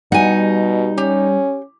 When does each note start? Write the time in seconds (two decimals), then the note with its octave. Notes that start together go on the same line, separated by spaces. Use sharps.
0.12 B2 G3 D#4 F#5 G#5
0.98 C#4 G4